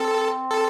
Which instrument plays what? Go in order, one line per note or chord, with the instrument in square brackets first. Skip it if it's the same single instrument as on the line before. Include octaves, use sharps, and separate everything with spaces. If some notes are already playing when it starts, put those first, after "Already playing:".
Already playing: [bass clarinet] C4 [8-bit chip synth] A4
[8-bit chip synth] A4